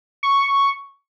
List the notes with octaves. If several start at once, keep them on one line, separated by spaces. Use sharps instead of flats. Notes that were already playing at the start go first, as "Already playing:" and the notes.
C#6